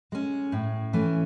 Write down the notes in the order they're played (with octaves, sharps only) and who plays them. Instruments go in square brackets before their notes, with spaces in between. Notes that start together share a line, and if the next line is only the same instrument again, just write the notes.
[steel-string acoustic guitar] G#3 C#4
A2
E3 A3 C#4